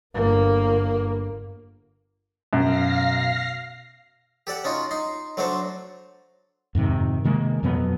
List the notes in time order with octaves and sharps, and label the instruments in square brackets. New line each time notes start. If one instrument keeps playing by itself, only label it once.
[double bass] G1 A#3
[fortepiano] F#2 [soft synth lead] B2 [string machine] F5 A#6 C7
[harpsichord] G4 A4 D5 F#5
C#4 D#4 F4 F#4
D#4 C6
F#3 A3 D4 F#4 C5
[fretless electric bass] F2 G#2 C3 D#3
C3 D#3 G#3 A#3
F2 B2 F#3 B3